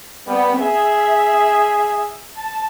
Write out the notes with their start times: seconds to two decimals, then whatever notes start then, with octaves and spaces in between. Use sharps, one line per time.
0.27 G3 B3
0.60 G#4 E5
2.35 A5